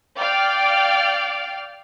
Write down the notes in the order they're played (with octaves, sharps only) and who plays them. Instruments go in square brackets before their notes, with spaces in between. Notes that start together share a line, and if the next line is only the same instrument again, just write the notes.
[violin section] D5 F5 G5 F6